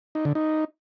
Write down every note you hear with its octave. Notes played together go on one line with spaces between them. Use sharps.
D#4
D3
D#4